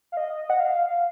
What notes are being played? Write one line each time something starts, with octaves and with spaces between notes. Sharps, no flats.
F5
D#5
F#5
F5